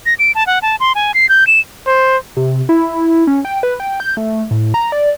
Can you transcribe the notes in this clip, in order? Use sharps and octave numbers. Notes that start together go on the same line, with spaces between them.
A#6
D7
A5
F#5
A5
C6
G#5
C7
G6
E7
C5
C3
E4
C#4
G5
B4
G5
G6
A3
A2
A#5
D5